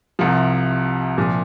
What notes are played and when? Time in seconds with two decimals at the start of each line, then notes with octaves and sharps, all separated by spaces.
0.19 C2 C3 F3
1.18 C2 A#2 F3